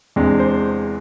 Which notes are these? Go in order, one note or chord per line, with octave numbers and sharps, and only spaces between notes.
E2 C3 G#3 D4
C5